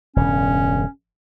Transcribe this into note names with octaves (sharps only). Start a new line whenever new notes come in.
E1 G2 C#3 C#4